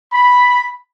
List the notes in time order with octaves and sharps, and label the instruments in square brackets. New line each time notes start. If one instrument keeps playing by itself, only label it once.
[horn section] B5